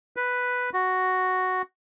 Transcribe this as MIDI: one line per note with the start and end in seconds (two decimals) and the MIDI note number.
0.17 0.70 71
0.74 1.62 66